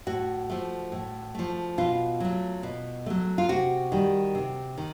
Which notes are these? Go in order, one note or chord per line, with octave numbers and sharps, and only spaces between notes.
A2 F#4
F3 A3
A2
F3 A3
B2 F4
F#3 A3
B2
F#3 A3
F4
C3 F#4
D#3 G3
C3
D#3